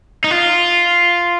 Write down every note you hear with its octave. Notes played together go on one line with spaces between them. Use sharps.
D#4
F4